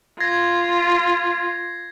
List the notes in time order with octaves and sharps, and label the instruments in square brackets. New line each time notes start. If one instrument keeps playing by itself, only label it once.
[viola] F4 [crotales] G#6 A#6 C7